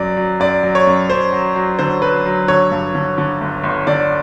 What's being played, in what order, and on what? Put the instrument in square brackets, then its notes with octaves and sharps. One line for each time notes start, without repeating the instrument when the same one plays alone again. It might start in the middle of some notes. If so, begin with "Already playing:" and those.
Already playing: [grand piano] F#2 F#3 D5
F#3
F#2 D5
F#3
C#5
F#2
F#2 C5
F#3
F#3
D3 C5
F#3 B4
F#3
D3 C#5
G2
D3
D3
G1
G1
D3 D5